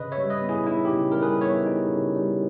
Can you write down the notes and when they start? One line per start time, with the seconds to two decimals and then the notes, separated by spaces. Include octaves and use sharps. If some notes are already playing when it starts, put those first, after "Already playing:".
Already playing: C#3 B4 D#5
0.12 C#5 E5
0.18 G3
0.30 B4 D#5
0.42 B3
0.49 E4 G#4
0.66 D#4 E4
0.85 G4
0.92 C#3
1.12 G3 A#4
1.22 G#4 B4
1.41 B3 C#5 E5
1.66 D#4
1.90 C#3
2.14 G3